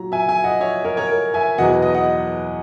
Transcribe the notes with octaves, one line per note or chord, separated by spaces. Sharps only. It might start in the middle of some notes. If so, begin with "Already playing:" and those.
Already playing: A#2 F#3 A#5
E5 G#5
E5 G#5
D#5 F#5
C#5 E5
A#4 C#5
A#4 C#5
A#4
E5 G#5
E2 B2 F#3 D#5 F#5
B4 D#5
B4 D#5
D#5 F#5